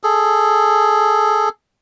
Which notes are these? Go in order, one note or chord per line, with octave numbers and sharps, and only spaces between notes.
G#4 A4